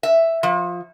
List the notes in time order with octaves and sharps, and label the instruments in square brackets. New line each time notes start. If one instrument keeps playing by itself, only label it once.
[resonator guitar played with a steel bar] E5
F3